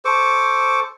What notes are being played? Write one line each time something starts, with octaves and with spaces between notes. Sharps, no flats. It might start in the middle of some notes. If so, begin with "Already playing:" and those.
A4 C5 C#6 D6